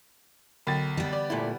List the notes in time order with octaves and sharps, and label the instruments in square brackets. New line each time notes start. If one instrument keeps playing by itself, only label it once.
[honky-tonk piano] B1 A6 [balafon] D3 G5
[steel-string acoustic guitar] G3 B3
[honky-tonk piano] D5
[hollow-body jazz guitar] A#2 A3 E4